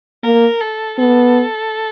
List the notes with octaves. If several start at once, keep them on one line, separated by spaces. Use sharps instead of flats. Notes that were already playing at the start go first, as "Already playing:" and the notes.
A#3 A#4
A4
B3 A4